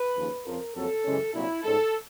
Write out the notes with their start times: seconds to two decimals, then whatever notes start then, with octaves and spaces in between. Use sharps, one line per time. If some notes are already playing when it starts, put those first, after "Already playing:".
Already playing: B4
0.16 D#2 C#3 F3
0.46 F2 C#3 F3 A#4
0.75 F2 C#3 F#3 A#3 A4
1.05 F#2 C#3 E3 G#3 C#4
1.34 C2 A#2 F#3 A#3 D4 E4
1.63 G#2 F3 G#3 C#4 A4